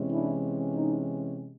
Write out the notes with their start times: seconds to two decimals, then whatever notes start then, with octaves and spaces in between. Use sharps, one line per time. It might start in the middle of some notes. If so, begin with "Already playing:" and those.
Already playing: C3 E3 G#3 C#4
0.09 D4 E4
0.73 D#4